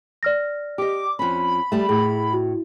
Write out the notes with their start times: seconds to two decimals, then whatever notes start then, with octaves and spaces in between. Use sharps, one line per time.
0.23 D5 F6 A#6
0.78 G4 D#5 D6
1.19 F2 C#4 B5
1.72 G3 A3
1.89 A2 G#4
2.33 F#4